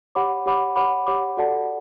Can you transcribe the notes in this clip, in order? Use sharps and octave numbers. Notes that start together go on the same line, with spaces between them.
G4 C#5 F#5 B5 D6
G4 C#5 F#5 B5 D6
G4 C#5 F#5 B5 D6
G4 C#5 F#5 B5 D6
F#4 A4 D5 F#5 A5